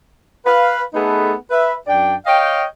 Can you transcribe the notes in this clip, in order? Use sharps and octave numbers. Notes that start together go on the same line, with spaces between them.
B4 F5
A3 B3 D#4 G#4 A4 B4
B4 E5
F#2 D4 D5 G5
C#5 D#5 F5 G5